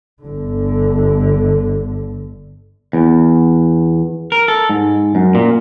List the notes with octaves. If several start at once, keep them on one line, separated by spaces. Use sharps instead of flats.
G1 D3
E2
A#4
A4
G#2
F#2
A#2